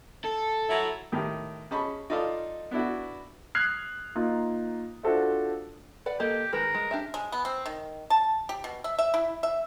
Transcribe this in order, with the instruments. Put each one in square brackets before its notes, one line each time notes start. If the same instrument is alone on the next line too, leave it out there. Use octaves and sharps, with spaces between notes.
[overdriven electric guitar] A4
[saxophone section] F#3 E4
[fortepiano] A2 D#3 G4
C#4 G#4 D#5 A5 B5 C#6
D#4 F4 A4 D5 D#5 F5
B3 D4 E4 F#4
[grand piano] D#6 F6 F#6 G#6 C7
A#3 D#4 F4
D4 F4 F#4 A4 C5 E5
[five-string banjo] B4 D5 F#5
[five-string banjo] A#3 A4 D#5 [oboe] G4
[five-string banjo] D#3 G#3 B4 [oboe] A#4
[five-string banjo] G#3
D4 G4 E5
[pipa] G#3
B3
C4
D#3
A5
G4
B2
E5
E5
E4
E5